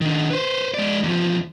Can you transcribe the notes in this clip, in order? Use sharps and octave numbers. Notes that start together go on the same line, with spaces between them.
D#3 D4
B4 C5
G#3 D5
E2 F3